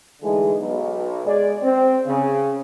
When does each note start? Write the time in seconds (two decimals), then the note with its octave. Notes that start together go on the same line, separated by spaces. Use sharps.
0.22 D3 E3 G#3 A3 D#4 G#4
0.59 B1
1.26 G#3 G#4 C#5 D5
1.63 C4
2.06 C#3